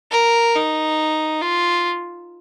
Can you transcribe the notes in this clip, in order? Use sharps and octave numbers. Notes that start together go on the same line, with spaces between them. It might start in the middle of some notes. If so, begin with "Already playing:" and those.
A#4
D#4
F4